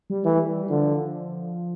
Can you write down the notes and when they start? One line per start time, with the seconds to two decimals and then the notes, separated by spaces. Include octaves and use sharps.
0.10 G3
0.25 E3 A3
0.39 G3
0.69 D3 F3